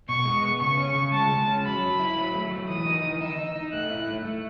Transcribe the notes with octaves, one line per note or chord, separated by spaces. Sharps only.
B2 C#6
G#3
B3
C#3 C#6
C#4
C#3
G#3 A5
G#3
C#4
F#3 B5
F#3
E4
F#3
A3
F#3
E3 D#6
D#4
E3
D#4 E6
D#4
D#4
A3 F#6
E4
A3
A3